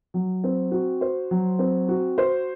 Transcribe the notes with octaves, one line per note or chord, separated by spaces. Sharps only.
F#3
C4
F#4
C5
F#3
C4
F#4
C5